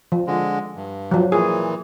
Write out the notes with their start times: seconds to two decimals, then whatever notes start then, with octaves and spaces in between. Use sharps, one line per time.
0.12 F3
0.27 D3 G#3
0.76 G2
1.11 F3 F#3
1.32 A#2 E3 G#4